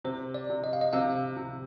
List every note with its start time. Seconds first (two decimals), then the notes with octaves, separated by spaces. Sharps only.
0.05 C3 C5
0.34 D5
0.50 C3
0.64 D#5
0.73 F5
0.81 D#5
0.93 C3 F5
1.37 C3